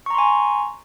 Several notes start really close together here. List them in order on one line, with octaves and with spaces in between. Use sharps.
C#6 A#5 C6 G#5